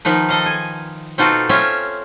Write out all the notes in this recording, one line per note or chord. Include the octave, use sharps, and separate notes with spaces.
D#3 F3 D#4 B4
A4 D#5 F5
G#5
B2 C4 D#4 F4 F#4 A4
C4 C#4 F4 C#5 E5